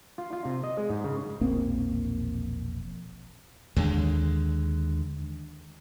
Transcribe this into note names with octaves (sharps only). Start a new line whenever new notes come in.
F4
F4
C3
D#5
G#3
G#2
C#3
E1 A#1 A#3 C4
D#2 D3 G#3